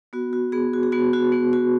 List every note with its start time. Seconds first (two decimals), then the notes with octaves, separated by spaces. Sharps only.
0.13 B3 F#4
0.33 F#4
0.52 B3 G#4
0.73 F#4
0.83 G#4
0.92 B3 F#4
1.13 F#4
1.32 B3
1.53 F#4